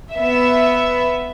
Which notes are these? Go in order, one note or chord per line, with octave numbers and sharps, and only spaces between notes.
B3 E5